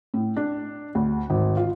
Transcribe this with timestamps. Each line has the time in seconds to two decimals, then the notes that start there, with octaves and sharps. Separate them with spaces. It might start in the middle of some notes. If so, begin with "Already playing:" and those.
0.14 A2
0.36 D4
0.95 D2
1.30 G#1
1.57 F4